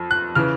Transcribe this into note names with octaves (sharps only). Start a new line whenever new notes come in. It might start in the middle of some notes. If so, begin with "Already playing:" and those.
Already playing: F2 F3
F#6
C#3 E3 F6